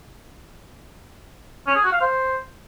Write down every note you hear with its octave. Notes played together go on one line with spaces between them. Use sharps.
C#4
G#4
F#4
F5
C5